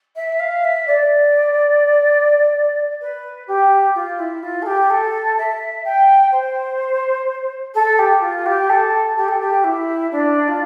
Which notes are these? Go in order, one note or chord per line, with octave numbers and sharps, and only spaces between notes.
E5
F5
E5
D5
B4
G4
F4
E4
F4
A4
G4
A4
E5
G5
C5
A4
G4
F4
G4
A4
G4
A4
G4
E4
D4
F4